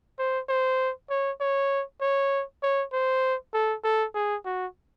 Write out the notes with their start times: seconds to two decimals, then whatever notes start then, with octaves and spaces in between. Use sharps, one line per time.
0.19 C5
0.49 C5
1.10 C#5
1.40 C#5
2.01 C#5
2.63 C#5
2.93 C5
3.54 A4
3.84 A4
4.15 G#4
4.45 F#4